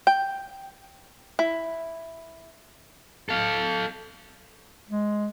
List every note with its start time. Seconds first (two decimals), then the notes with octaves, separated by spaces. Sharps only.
0.07 G5
1.39 E4
3.29 A4 F5
4.88 G#3